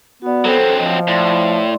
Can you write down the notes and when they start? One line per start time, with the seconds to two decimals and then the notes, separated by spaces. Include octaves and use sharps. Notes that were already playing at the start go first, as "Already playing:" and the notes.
0.22 B3 F#4 D5
0.45 F#3 C4 A4 C5
0.79 F3 D#5
1.08 A2 D5 C6